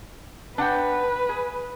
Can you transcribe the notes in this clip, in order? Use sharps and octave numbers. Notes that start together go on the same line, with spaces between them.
D4 B4 F#5 G5
G#4